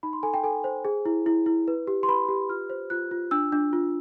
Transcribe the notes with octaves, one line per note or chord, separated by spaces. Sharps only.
D#4 B5
C6
A4 G#5
G5
A4 G#5
C5
G#4
E4
E4
E4
B4
G4
C6
B4 B5
G4
F4 F6
C5
F4 F#6
F4
D4 E6
D4
F4